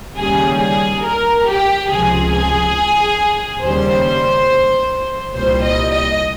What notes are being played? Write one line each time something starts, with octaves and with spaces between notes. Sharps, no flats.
D#2 C#3 G3 G#4
G#4
A#4
G4
C#2 C3 F3 G#4
G#4
D#2 C#3 G3 C5
C2 A#2 G3 C5
D#5
D#5